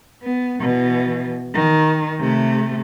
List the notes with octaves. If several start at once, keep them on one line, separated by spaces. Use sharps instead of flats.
B3
B2 E3
D#3
C3 A3